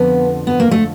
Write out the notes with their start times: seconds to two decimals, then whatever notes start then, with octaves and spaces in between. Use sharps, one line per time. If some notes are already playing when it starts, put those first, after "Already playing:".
Already playing: F2 D3 F3 B3
0.47 B3
0.60 A#3
0.71 A3